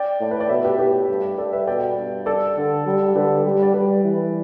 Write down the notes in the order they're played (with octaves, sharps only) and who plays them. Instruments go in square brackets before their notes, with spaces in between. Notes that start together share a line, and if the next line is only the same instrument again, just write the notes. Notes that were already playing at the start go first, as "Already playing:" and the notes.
Already playing: [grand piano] D5 G5
[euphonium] A2
[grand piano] B4
D5
[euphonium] B2 [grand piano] B4 E5
[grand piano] G4 B4
[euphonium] A2 [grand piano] G4 B4
[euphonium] G2
[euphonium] G2 [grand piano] A4 D5
[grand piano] B4 E5
[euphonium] B2 [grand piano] D5 G5
[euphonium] G2
[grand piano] A4 D5
[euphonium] D3
G3
[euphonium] D3 [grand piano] G4 B4
[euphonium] G3
[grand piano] D5
[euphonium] G3 [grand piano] G4 B4
[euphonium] E3